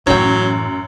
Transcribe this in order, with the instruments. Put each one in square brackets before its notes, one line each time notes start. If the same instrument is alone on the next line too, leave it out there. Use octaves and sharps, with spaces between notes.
[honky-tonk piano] F#2 [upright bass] A2 E3 [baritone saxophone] F#3 [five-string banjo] C#5 G5